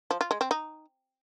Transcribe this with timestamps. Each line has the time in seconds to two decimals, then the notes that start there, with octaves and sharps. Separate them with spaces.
0.11 F3
0.21 F4
0.31 G#3
0.41 C4
0.51 D#4